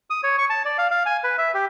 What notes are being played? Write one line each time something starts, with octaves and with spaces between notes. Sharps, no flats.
D#6
C#5
C#6
A5
D5
F5
F5
G#5
B4
E5
G4